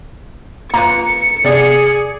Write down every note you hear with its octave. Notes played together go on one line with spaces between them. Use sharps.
A#3 F4 B4 A#5 C#7
C3 B3 G#4 D5